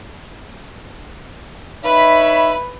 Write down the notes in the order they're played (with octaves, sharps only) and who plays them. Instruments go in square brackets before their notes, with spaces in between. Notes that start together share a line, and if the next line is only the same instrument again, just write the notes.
[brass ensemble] D#4 C#5 E5 [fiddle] B4 B5